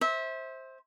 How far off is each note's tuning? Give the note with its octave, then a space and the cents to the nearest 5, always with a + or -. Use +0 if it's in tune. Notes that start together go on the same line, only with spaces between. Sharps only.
C5 +15 E5 -25